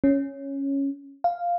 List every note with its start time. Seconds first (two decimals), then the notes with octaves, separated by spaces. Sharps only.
0.04 C#4
1.24 F5